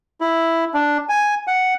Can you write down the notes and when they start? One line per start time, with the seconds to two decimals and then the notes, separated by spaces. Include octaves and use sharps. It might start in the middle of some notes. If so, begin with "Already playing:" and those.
0.21 E4
0.74 D4
1.09 G#5
1.47 F#5